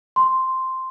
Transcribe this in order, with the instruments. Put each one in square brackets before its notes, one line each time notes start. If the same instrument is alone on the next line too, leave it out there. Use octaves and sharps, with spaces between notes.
[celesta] C6